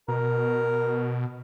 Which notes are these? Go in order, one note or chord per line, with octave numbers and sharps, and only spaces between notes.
B2 A#4